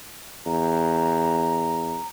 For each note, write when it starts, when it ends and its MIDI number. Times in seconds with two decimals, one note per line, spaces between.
0.46 1.98 40
0.46 2.07 82